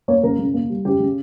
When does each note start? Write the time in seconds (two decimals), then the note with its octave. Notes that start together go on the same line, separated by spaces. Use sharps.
0.08 A#3 C#5
0.23 C#3 A#4
0.39 C#3
0.54 A#3
0.70 G3
0.85 C#3 G4
1.00 C#3